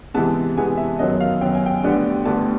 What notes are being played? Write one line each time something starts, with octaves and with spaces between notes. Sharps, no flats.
C3 E3 G#3 B3 A5
C3 E3 G#3 B3 G#5
E5
F#2 D#3 F#3 B3 D#5
F5
F#2 D#3 F#3 B3 G5
G#5
G5
D2 D3 G3 B3
D2 D3 G3 B3 A5